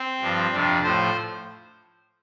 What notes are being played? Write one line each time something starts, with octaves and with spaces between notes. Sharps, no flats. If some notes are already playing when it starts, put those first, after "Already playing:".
Already playing: C4
G2 F3
F2 C3 F3 D4
A2 F3 C5